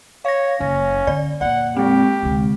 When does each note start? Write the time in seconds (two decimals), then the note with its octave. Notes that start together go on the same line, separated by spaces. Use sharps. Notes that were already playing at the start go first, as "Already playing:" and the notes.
0.25 C#5 F5 A#6
0.60 F#1 C#4
1.07 D3 D5
1.41 F2 A#2 D5 F#5
1.77 G#3 C4 G4
2.23 D2 C3